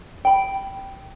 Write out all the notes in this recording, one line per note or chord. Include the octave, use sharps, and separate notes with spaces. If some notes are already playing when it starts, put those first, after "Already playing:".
G5 B5